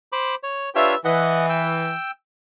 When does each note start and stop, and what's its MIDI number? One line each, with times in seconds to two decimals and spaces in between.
0.12 0.35 72
0.12 0.35 83
0.12 0.35 86
0.43 0.70 73
0.75 0.95 62
0.75 0.95 65
0.75 0.95 67
0.75 0.95 71
0.75 0.95 73
0.75 0.95 76
1.05 1.92 52
1.05 1.46 75
1.05 1.46 78
1.49 2.11 79
1.49 2.11 88